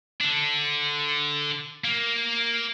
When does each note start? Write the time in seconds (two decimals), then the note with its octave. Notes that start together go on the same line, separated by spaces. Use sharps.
0.21 D3 D4
1.84 A#3